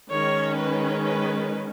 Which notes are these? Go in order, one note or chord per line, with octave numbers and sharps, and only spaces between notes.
D#3 G#3 C#4 C#5
B4
B4